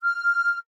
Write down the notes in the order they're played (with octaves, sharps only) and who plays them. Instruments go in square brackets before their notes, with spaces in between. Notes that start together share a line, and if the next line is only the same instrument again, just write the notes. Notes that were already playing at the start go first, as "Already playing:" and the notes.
[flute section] F6